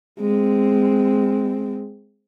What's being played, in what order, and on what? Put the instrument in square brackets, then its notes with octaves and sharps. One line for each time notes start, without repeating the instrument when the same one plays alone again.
[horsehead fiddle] G#3 C4